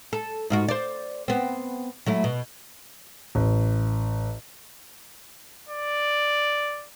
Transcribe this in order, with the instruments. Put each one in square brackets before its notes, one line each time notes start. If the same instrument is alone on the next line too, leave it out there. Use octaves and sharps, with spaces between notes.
[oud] A4
G#2 F4 F#4
C5 D5
B3 C4
F#3 A3 E4
B2
[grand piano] A1
[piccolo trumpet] D5